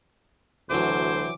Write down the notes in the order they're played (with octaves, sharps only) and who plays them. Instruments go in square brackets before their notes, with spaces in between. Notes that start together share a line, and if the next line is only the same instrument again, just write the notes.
[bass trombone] D2 [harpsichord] C3 E3 F#3 [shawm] C5 [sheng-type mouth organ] D6